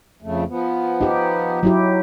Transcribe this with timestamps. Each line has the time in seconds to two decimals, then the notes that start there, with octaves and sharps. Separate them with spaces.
0.22 F2 C#3 A3
0.48 F3 B3
1.01 D#4 G4
1.63 F#3 E4 G4